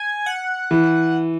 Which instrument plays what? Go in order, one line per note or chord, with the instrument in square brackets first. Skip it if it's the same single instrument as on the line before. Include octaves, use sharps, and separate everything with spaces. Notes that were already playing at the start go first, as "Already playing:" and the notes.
Already playing: [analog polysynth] G#5
F#5
[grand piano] E3